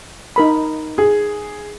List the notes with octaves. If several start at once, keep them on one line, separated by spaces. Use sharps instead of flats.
D#4 A#4 B5
G#4